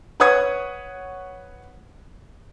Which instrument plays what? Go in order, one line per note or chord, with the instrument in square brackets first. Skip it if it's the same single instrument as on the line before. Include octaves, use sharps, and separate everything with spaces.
[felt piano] B4 C#5 F#5 C#6 D#6 G#6